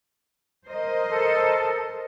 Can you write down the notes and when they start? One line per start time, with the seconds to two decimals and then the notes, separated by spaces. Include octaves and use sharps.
0.68 A#4 C5 D#5
1.08 A4